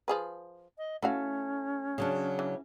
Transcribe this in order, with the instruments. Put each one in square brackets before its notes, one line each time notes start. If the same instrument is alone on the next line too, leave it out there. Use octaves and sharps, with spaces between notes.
[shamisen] F3 G#4 B4
[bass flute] D#5
[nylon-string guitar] A3 [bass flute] C#4 [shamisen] E4 F#4 F5
[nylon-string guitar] C#3 F#3 D4
[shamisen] E3